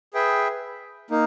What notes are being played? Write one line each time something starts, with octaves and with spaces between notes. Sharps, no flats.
G#4 B4 E5 G5
A#3 D#4